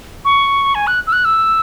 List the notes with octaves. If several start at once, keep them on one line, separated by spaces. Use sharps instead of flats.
C#6
G#5
F#6
E6
F#6
E6